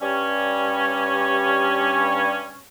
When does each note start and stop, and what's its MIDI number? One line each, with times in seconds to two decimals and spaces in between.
0.02 2.58 43
0.02 2.58 55
0.02 2.58 61